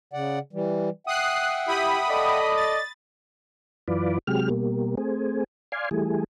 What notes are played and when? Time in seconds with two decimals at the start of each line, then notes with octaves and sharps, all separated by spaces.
0.13 C#3 D5 F#5
0.53 E3 G3
1.07 E5 F#5 G5 D#6 F#6 C7
1.67 E4 G4 B5 D#6
2.09 A4 D5 D#5
2.56 A6
3.88 F#2 E3 F4 B4 D5
4.27 C3 F#3 G#3 G4 F6
4.50 B2 G3 A#3
4.97 A3 C4 G#4
5.72 D5 F5 G#5 C6
5.91 E3 G3 A3 G#4